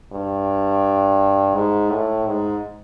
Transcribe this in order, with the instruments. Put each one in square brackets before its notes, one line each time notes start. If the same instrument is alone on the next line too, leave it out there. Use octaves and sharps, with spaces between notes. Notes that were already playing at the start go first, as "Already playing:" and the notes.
[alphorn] G2
G#2
A2
G#2